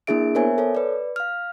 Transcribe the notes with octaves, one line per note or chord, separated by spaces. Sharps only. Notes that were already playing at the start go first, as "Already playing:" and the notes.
A#3 D4 E4 G#4 E5 D7
B3 A#4 C5 C#5 E5 G#5
A4 C#5
B4 D5
F5 F6